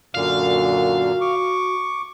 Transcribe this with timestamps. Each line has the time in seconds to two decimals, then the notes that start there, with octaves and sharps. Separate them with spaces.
0.15 F#2 A#2 D3 F#4 F5
1.21 C#6 D6